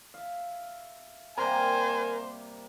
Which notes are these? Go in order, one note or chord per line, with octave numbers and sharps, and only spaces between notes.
E5 F5
C3 G3 A#3 A#4 C5 G#5